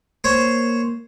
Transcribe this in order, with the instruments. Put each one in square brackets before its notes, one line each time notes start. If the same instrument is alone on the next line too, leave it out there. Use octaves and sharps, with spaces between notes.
[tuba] A#3 [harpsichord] C5 C#5